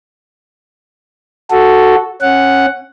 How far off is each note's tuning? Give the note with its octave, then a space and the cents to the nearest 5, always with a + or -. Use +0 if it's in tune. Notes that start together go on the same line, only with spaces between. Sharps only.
F#4 +0 A4 +0
C#4 -20 F#5 +0